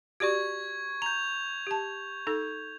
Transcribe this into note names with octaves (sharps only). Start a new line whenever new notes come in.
F#4 G4 D5 C#6 G#6
A#5 G6 F7
G4 A5
D#4 A4